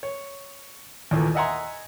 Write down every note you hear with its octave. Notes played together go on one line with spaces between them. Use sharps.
C#5
D#2 A#2 E3 A3
D#5 E5 F#5 G#5 A#5 C6